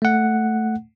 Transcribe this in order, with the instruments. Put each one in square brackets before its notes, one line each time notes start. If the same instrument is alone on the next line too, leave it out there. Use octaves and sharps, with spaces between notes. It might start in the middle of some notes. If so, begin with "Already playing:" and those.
[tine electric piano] A3 F#5